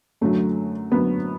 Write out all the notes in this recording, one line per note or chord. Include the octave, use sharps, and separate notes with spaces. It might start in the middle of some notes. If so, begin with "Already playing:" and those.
F#2 D3 F#3 A3
F#2 D3 F#3 B3